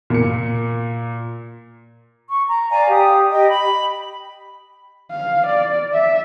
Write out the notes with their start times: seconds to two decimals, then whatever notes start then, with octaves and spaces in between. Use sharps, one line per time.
0.10 A#2 C#7
2.28 C#6
2.47 A#5
2.70 D5 F5 G#5 A#5
2.90 G4 D#6
3.31 G4 D#5 G5
3.48 B5
5.12 F5
5.47 D5
5.93 E5